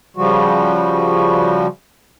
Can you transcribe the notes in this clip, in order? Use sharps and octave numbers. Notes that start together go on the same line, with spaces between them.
C#3 F3 G3 F#4